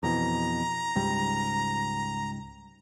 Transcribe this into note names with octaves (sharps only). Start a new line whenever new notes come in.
F2 B2 E3 A#5
C#2 G#2 G3